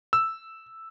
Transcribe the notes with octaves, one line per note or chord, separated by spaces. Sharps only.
E6